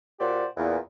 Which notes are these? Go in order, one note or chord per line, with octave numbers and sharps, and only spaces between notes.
A#2 F#4 G4 C5 D5
E2 A#2